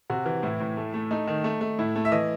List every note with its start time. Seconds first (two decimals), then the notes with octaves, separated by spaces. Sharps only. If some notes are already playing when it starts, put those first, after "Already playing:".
0.10 C3 F#4
0.26 E3
0.43 A2 E4
0.61 A2
0.77 A3
0.94 A3
1.11 A3 D#4
1.27 D#3
1.44 A3
1.61 A3
1.79 A2 E4
1.96 A3
2.05 E5
2.12 E3 D#5